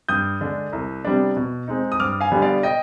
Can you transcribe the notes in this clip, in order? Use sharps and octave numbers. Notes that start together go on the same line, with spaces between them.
G2 D#6 G6
D3 G#3 D4
C2
C3 G3 B3 D4
B2
G#3 C4 D#4
D#6
G2 D6 F6
F5 G#5
D3 G3 B3 D4
D5 F5
D#5 G5